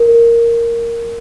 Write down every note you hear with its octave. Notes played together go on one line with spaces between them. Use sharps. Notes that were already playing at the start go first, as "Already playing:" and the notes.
Already playing: A#4